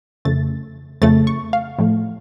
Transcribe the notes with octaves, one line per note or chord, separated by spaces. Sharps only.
F2 C#3 A3 A6
F2 C#3 A3 A6
C#6
F5
A2 F3 A3